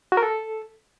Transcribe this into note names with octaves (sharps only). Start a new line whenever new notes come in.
F#4
A#4
A4